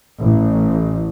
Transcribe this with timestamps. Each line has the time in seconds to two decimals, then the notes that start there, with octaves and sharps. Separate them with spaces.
0.20 A1